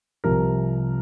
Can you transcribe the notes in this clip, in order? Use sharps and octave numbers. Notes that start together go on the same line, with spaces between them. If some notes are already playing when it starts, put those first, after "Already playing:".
C2 C3 F3 A#4